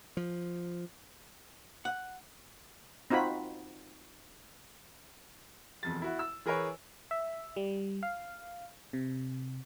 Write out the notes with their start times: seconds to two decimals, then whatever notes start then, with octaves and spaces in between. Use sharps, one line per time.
0.17 F3
1.85 F#5
3.10 C4 D#4 F4 F#4 B5
5.83 E1 F2 A6
6.02 E4 F#4
6.19 E6
6.45 E3 G#4 A#4 B4 C#5
7.11 E5
7.56 G3
8.03 F5
8.93 C3